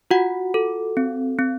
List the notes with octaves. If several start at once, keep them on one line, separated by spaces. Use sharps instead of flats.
F4 F#4 F#5
A4
C4
C4